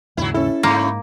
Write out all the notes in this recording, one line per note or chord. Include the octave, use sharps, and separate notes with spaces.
D#2 G#2 C#3 F#3 E4
C#4 E4 A4
G#2 C#3 A3 A#3